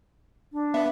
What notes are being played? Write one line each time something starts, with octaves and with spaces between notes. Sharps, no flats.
D4
B3 E5